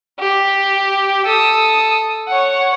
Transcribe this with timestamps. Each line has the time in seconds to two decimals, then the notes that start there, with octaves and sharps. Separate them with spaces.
0.20 G4
1.25 A4 D#6
2.28 C#5 F#5